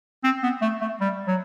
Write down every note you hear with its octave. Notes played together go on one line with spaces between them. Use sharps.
C4
B3
A3
A3
G3
F#3